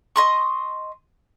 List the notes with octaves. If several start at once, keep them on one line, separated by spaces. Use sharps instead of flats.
D#5 C6 C#6